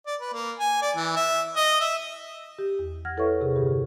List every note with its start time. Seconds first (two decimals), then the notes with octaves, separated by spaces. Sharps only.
0.06 D5
0.21 B4
0.33 A#3
0.58 G#5
0.82 D5
0.96 E3
1.16 E5
1.56 D#5
1.80 E5
2.59 G4
2.79 E2
3.05 F#5 F6 G#6 A#6
3.17 E4 A4 B4 C#5 E5 C#6
3.41 C3 G#4 A#4
3.56 G2 D3 G4 G#4